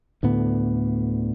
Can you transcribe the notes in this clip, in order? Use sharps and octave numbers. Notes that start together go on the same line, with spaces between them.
D2 A2 D3 B3